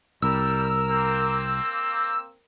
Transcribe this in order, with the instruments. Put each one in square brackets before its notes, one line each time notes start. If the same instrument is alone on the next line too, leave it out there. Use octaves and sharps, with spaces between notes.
[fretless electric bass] C2 [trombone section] G3 [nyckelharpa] A#4 [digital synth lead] E6
[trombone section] A#3 C4